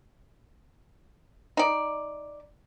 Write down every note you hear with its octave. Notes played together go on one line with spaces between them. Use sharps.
D#4 D5